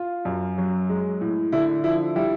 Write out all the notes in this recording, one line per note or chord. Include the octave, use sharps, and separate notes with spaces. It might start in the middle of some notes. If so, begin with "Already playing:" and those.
Already playing: F4
F#2
F#3
G#3
A2
D3 E4
F3 E4
G3 E4